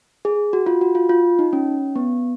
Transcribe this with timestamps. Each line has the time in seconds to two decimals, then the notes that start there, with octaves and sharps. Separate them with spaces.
0.25 G#4
0.53 F#4
0.66 F4
0.81 F#4
0.95 F4
1.09 F4
1.39 D#4
1.53 C#4
1.96 B3